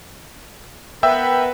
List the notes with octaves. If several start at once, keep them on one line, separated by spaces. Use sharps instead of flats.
B3 A#4 B4 E5 G5 E6